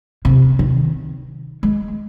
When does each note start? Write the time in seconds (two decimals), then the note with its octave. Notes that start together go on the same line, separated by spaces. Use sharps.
0.25 C3
0.59 D#3
1.63 G#3